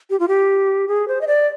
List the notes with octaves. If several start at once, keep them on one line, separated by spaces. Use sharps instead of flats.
G4
F4
G4
G#4
C5
D#5
D5